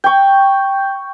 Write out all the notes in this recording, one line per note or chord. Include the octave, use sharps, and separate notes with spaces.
G5 C#6